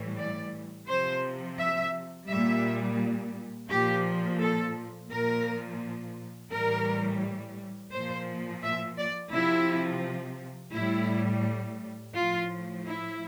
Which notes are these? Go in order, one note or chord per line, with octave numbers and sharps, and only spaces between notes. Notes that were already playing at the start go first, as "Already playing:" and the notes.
Already playing: A2 E3 G3
D5
C3 F3 C5
E5
A#2 G3 E5
A#2 F3 G4
A4
A#2 F3 A#4
A2 E3 G3 A#4
A#2 F3 C5
E5
D5
C3 F3 E4
A2 G3 E4
A2 F3 F4
E4